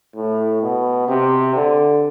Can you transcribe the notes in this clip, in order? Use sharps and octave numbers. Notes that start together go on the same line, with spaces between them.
A2
B2
C3
D3